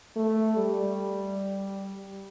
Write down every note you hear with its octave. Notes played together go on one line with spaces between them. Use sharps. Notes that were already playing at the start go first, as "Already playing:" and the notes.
A3
G3